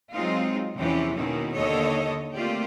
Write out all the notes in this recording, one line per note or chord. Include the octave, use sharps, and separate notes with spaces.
F#3 G#3 C4 D#4 F4
E2 C3 E3 F3 C#4 G4
B2 D#3 A#3 C#4 E4
D#2 D3 A4 C#5 D#5
A3 A#3 C4 F4 G4 D5